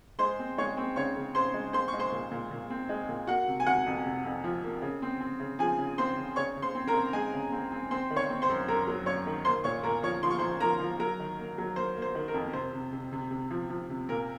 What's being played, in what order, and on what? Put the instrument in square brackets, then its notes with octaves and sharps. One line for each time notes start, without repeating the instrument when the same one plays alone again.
[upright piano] G#3 C5 C6
C4
G#3 C#5 C#6
C4
C#3 C#5 C#6
C#3
C#3 C5 C6
G#3
C4 C5 C6
C#6
G#3
C5 C6
A#2
A#2
A#2
C4
G#3
A#2
A#3 F#4 F#5
C3
G#5
C3 F#4 F#5
F2
C3
F2
F3
A#3
C#3
C4
C4
C#3
F3 G#4 G#5
C#3
C4 C5 C6
C#3
C#3 C#5 C#6
C#3
C5 C6
C4
A#4 A#5
C4
G#3 G#4 G#5
C#3
C4
C4
C4 C5 C6
D#3
C#5 C#6
C4
C5 C6
F#2
F#2 A#4 A#5
F#3
F#2 C#5 C#6
D#3
A#3 C5 C6
A#2 C#5 C#6
A#2 A#4 A#5
F3 C#5 C#6
F3 C6
C#6
F3 C5 C6
F3 A#4 A#5
F3
F#3 A#4 A#5
D#3
A#3
F#3
A#3 C5
A#3
C5
D#3
A#4
F2
C3 C5
C3
C3
C3
C3
F3
F3
C3
A#2 A#4